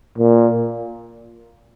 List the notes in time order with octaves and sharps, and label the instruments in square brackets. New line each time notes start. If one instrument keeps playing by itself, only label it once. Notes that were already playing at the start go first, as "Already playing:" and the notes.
[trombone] A#2